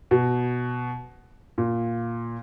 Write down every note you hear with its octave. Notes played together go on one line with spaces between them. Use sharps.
B2
A#2